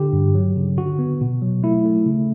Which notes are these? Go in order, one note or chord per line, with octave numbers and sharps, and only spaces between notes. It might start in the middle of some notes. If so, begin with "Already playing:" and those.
Already playing: D3 G4
G2
F#3
C#3
D3 F#4
B3
B2
F#3
A3 E4
A3
C#3